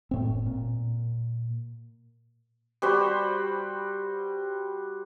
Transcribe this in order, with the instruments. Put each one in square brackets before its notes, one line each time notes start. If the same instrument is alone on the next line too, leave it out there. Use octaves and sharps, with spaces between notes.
[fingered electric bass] F#1 A2 C4
A#2
[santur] G3 F#4 C5 B5